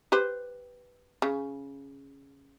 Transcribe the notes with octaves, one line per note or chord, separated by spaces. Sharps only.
G4 B4 C5
C#3